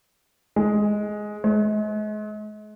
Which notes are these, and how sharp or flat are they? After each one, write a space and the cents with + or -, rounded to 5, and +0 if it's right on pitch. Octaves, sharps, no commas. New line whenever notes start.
G#3 +10
G#3 +40